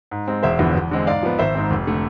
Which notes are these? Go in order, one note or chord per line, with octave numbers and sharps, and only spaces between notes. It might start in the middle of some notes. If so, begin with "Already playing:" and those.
G#2
G#3 C4
E1 C5 E5
E2 D3 F3 B3
E2
D3 G#3 C4
G#2 D5 F5
F3 B3
G#1 C5 E5
G#2 G#3 C4
F1
D3 A3